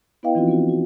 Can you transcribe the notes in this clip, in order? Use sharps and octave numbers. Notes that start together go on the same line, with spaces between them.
B3 E4 B4 D#5 F5 G5
E3 F3 C4 D#4 F4 F#4
B3 C#4 F#4
F#4